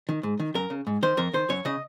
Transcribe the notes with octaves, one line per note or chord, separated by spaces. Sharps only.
D#3
G#2
D#3
F#2 A#4
C#3
G#2
D#3 C5
F2 A#4
D#3 C5
F#2 C#5
C#3 D#5